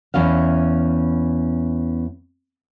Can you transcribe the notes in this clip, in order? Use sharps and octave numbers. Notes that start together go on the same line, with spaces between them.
E2 C#4 E4 F5